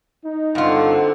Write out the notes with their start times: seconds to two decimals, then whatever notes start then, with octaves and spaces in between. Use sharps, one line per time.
0.24 D#4
0.55 G2 D3 C4 F4 F#5